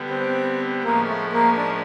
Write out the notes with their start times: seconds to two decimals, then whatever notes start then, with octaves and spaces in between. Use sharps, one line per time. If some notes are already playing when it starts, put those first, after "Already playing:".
Already playing: D3 G3 B3
0.10 C4
0.84 A2 F3 G#3 A#3 C#4
1.08 A3
1.32 A#3
1.57 D4